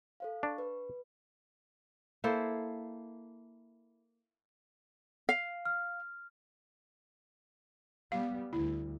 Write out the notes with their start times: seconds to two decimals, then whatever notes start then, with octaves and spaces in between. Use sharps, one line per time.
0.20 A4 C5 F5
0.43 D4 C#6
0.58 B4
2.24 A#3 E4 A4 C5
5.29 F5
5.65 F6
8.12 G3 B3 F5
8.53 D2 E4